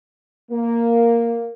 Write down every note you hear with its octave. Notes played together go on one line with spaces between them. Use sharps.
A#3